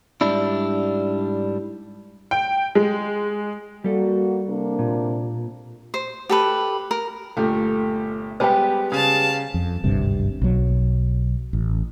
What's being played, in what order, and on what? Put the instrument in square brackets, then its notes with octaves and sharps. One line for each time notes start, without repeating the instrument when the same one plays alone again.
[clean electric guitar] G#2 G3 D4 E4
[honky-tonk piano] G5
G#3
[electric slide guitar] G3 A4 [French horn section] A#3 F#4
[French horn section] C3 A#3 D4
[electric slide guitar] A#2
[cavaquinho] C5
G4 A4 B4
A#4
[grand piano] G1 A#2 G4 [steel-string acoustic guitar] A3
[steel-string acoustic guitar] G3 G#3 B3 [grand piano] G4 B4 [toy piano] C5 G5
[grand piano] C#3 [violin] F5 A5
[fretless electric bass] F2
G#1 D2 G2 C3
B1 F#3
A1